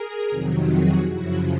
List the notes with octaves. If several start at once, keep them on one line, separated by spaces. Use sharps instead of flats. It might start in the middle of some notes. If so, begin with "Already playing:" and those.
Already playing: G#4 A#4
F2 C3 D#3 F#3
F#4 G#4
F#2 C#3 F3 E4 F#4